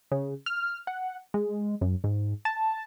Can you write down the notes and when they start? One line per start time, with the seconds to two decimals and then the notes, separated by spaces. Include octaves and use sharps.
0.12 C#3
0.46 F6
0.87 F#5
1.34 G#3
1.81 F#2
2.04 G#2
2.45 A5